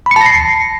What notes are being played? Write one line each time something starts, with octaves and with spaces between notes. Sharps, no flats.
A5 B5 A#6 C7 C#7